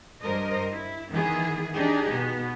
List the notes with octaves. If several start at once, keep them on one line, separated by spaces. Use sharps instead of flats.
G2 A#4 C5 D#5
E4
D#3 E3 B3 E4 G#4
D4 D#4 G4 G#4
B2 B3